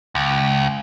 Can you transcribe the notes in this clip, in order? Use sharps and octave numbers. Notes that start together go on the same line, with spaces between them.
C#2